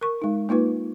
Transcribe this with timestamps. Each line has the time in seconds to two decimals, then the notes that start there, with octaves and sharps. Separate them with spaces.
0.01 A#4 C#6
0.22 G#3 D#4
0.49 A#3 D#4 F4 B4